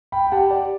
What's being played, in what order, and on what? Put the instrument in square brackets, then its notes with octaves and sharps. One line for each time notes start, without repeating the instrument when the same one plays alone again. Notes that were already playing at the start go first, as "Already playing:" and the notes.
[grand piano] G5 B5
G5
[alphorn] G4 [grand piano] F#5 A5
[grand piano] D5